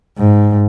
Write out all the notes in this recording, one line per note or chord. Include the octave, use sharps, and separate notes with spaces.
G#2